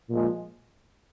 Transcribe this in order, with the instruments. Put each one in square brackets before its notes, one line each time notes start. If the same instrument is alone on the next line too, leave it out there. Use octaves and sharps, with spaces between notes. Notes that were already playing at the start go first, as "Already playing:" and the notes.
[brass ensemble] A#2 F3 G#3